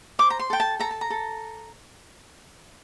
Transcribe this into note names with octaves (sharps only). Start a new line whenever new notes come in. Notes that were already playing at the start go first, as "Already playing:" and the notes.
C5 D6
A#5
C6
A4 G5
A5
A4 A#5
A5
A#5
A4